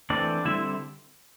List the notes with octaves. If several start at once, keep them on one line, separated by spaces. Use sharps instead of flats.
E3 A3 C4 D4 D5
D3 G3 C4 E4 E5